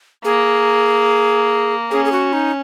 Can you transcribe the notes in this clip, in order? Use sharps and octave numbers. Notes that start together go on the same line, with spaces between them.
A#3 G#4
C#4 G#4
G#4
F#4
D#4